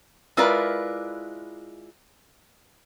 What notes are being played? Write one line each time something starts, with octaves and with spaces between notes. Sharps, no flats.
G#3 E4 F4 A#4 B4 D5